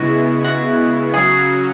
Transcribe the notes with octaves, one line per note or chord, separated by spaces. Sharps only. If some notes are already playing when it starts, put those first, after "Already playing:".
Already playing: C#3 G#3 B3 E4 F#4
F#4
C#3 F#3 C#4 F#4 G#4